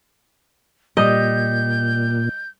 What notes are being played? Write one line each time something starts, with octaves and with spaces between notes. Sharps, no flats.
A#2 G3 D#5 G6